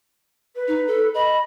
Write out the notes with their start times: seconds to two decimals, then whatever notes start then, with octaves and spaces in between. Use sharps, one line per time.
0.55 B4
0.68 D#4
0.87 A4
1.14 D#5 B5